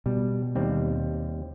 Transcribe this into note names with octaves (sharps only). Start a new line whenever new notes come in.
B2 G3
D#2 G3 C4